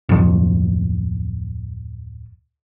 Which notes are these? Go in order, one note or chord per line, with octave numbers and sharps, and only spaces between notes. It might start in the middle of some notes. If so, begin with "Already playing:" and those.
D1 F2